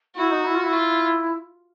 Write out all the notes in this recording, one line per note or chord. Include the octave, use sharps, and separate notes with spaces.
E4 F#4
D#4
E4
F4
E4
F4